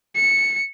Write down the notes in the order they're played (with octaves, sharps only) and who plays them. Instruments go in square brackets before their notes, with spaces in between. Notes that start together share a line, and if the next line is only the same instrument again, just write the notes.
[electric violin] C#7